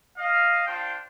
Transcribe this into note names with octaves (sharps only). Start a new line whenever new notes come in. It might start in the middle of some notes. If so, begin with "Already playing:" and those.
D#5 F5
D4 F4 C5 G5